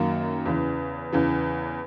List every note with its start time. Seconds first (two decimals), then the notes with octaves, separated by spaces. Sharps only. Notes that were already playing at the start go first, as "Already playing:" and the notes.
Already playing: F#2 D#3 A#3
0.46 E2 C#3 E3
1.12 E2 C#3 E3